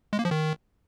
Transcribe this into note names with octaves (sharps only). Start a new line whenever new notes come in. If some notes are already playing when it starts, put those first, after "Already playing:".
G#3
A#3
F3
D#3